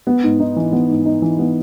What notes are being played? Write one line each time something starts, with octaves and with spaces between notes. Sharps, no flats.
B3
G#2
D#4
E3
B3
G#2
D#4
E3
B3